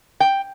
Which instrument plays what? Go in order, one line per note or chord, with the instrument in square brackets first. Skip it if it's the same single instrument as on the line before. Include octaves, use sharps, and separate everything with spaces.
[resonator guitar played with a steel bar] G5